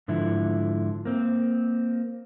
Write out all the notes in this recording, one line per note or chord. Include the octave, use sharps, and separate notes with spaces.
G#2 D3 F3 E4
A#3 C4